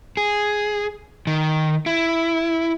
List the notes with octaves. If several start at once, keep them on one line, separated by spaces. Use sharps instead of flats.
G#4
D#3
E4